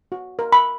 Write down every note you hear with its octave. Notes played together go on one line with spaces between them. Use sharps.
F#4
A#4
B5